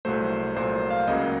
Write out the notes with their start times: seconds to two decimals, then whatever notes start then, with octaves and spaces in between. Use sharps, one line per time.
0.05 C2 A#2 F#3 A3 C5
0.56 C2 A#2 F#3 A3 C5
0.90 F5
1.07 C#2 C#3 F#3 A#3 D#5